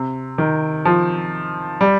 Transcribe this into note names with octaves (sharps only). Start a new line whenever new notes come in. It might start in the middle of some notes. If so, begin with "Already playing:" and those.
Already playing: C3
D#3
F3
G3